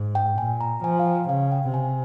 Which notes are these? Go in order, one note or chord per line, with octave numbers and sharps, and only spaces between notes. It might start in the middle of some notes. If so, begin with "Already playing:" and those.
Already playing: G#2
G5
A#2 G#5
A#5
F3 G#5
F5
G5
C#3 F5
G5
C3 G#5